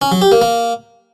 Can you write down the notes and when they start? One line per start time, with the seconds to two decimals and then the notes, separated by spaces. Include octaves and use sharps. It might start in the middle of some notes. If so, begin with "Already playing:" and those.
0.02 C#4
0.12 F#3
0.22 G4
0.32 A#3
0.42 A#3